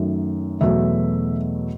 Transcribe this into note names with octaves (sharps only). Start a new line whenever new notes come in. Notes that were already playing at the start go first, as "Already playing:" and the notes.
Already playing: F#2 D#3 F#3 A3
E2 B2 F#3 A3 E5